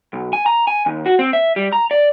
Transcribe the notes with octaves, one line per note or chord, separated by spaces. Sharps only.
B1
G#5
A#5
G#5
D#2
F#4
C4
E5
G3
A#5
D5